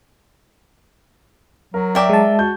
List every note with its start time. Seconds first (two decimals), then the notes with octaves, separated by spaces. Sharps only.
1.74 F#3 A#4
1.95 A#4 D5 E5 G5 D6
2.09 G#3 A5
2.39 F#4 G6